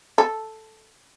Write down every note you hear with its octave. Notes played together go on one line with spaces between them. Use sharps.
A4